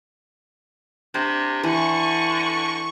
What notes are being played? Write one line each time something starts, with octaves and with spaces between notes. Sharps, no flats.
C3 D4
D3 E3 C#6